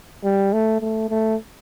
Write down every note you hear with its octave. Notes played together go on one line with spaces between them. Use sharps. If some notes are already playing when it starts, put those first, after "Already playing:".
G3
A3
A3
A3